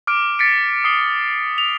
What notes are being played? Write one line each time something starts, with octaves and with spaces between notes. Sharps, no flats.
D6 F6 D7
A6 B6 C#7 D7
D#6 C7 G7
F7